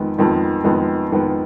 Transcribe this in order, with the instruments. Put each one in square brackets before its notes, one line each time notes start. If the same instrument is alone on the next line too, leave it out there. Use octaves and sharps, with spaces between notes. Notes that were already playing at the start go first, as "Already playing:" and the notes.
Already playing: [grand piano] F2 D#3 G#3 B3
F2 D#3 G#3 B3
F2 D#3 G#3 B3
F2 D#3 G#3 B3